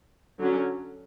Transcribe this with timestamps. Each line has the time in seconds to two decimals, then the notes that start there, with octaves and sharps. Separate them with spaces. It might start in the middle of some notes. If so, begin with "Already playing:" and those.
0.39 D3 F#3 C#4